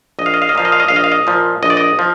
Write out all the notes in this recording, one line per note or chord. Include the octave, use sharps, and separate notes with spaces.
A#1 D#5
F5
D#5
F5
D#5
A#2 F3 F5
D#5
F5
D#5
A#1 F5
D#5
F5
D#5
A#2 F3
A#1 D#5
D5
D#5
F3